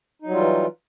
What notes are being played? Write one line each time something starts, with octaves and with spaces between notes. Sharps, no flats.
E3 F#3 G3 D#4 F4